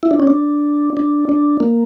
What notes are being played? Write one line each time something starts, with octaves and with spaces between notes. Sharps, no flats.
E4
D4
C#4
D4
D4
D4
A#3